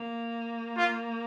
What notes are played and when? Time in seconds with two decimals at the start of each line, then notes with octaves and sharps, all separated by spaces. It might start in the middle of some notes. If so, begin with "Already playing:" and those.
Already playing: A#3
0.77 F4